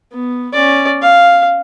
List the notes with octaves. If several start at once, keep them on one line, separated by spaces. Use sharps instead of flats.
B3
C#4 D5
F5